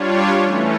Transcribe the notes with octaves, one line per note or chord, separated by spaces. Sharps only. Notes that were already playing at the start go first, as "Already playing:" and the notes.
Already playing: G3 D4 F4 C#5
E3 A3 C#4